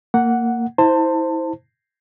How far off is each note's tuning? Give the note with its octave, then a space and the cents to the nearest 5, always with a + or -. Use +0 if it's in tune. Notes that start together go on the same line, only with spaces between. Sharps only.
A#3 -15 F#5 +0
E4 -30 C5 +0 A5 +25